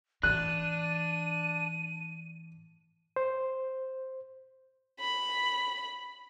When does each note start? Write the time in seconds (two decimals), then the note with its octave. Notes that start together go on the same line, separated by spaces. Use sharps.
0.23 A2 E3 D4 F#6 D#7
3.16 C5
5.00 B5